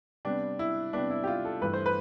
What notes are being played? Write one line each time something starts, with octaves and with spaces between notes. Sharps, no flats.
C3 G3 B3 D4
E4
C3 G3 B3 D4
E4
G4
F4
A4
G2 E3 A3 B4
C5
B4